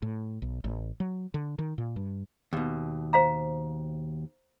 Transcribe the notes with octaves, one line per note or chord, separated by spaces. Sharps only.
A2
B1
A1
F#3
D3
D#3
A#2
G2
D#2 B2
C5 F5 A#5